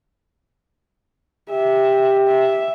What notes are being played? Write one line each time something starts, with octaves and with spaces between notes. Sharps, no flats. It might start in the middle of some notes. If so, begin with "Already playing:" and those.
G4 E5
E5